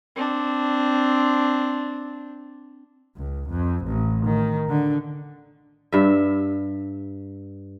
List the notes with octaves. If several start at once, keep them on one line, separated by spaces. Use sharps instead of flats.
C4 D4
C#2
F2
A1
D#3
D3
G2 E5